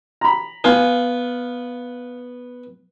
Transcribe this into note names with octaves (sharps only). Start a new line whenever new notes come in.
A#5 B5
B3 F4 F5 G#5